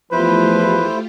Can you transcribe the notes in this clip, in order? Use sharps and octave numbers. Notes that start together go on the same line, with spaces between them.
E2 F3 A3 E4 F4 G4 B4 C5